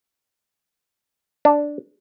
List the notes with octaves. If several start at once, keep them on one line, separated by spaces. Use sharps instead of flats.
D4